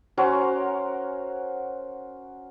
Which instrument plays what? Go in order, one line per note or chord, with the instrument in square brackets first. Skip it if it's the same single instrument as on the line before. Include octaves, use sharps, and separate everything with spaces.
[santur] C#4 F#4 A#4 C5